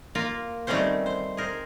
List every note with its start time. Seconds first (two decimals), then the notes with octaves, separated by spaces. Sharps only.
0.15 A#3 F4 A#4
0.67 D#3 G3 A3 C4 C#4 C5
1.06 C5
1.37 G#4 A#4 C5